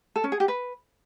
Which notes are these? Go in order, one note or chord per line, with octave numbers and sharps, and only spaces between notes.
A4
C#4
G#4
G4
B4